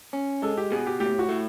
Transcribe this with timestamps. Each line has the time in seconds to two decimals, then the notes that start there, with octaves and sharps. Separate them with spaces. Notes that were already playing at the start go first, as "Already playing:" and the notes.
0.13 C#4
0.42 G#3 A4
0.57 G4
0.72 B2 G#4
0.86 G4
1.00 A2 G4
1.19 F#4
1.29 A3